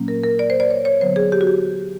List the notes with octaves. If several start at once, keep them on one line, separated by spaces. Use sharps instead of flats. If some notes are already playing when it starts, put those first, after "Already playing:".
Already playing: A#2 F#3 A#3 C#4
A#4
A#4
D5
C5
D5
C#5
C#5
D3 F#3 B3 C5
G#4
G4
F#4
G4